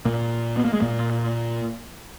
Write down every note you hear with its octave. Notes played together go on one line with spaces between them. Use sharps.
A#2 A#3
B3
A#3
G#3
A#2 A#3